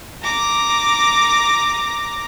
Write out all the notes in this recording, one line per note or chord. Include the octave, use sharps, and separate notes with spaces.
A#5 D6